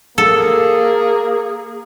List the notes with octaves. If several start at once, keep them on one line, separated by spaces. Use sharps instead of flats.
A#3 G#4 A4